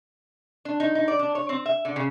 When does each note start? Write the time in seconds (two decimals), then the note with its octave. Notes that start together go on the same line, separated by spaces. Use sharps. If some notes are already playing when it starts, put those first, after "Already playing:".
0.65 D4
0.80 D#4
0.95 D#4
1.08 D5
1.19 D4
1.35 C#5
1.49 C4
1.66 E5
1.85 D3
1.96 C#3